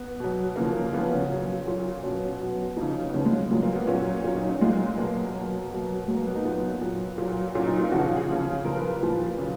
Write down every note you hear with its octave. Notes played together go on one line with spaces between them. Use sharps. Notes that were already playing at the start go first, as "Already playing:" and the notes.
Already playing: B3
B2 F#3
C#3 F3 A#3
C#3 F3 B3
C#4
A#2 F#3
A#2 F#3
B2 F#3 C#4
B2 F#3 B3
C#3 F3 D#4
B3
C#3 F3 C#4
G#3
A#2 F#3 G#3
A#3
B3
A#2 F#3 C#4
A#2 F#3 C#4
D#4
C#4
A#2 F#3 G#3
B2 F#3 A#3
A#3
B2 F#3
B2 F#3
B2 F#3 G#3
A#3
B3
D#4
A#2 F#3 B3
A#2 F#3
A#2 F#3
A#2 F#3 C#4
D#4
F4
C#3 F3 F#4
G#4
G#4
C#3 F3 G#4
A#2 F3 A#4
B4
B4
A#2 F3
C#3 F#3